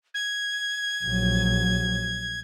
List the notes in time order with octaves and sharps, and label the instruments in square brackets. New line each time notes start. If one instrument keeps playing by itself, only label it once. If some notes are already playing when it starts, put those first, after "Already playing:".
[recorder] G#6
[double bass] A#1 F#3